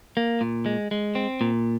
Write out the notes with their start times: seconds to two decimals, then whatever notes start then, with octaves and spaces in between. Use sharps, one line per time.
0.17 A#3
0.41 A#2
0.66 G#3
0.91 G#3
1.15 C4
1.41 A#2